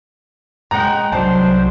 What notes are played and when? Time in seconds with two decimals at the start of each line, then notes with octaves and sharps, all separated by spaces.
0.71 G#3 C#4 D#5 F#5 G5 A#5
1.12 C2 F#3 D4 C5 A5